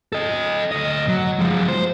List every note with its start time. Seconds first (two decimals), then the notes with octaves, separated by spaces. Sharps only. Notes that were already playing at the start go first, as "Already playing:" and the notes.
0.12 A4 D#5
0.72 D2 D#5
1.08 F#3
1.39 F3 G#3
1.68 C5